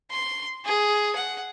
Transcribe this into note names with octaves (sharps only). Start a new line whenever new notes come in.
C6
G#4
F#5